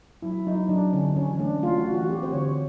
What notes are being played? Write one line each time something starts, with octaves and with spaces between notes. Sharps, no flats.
F#3 E4
F#3 D#4
F#3 D4
D3 C#4
E3 C#4
A3 D4
A3 F4
F#4
E3
F#4
C4 G4
C5
D3 C#5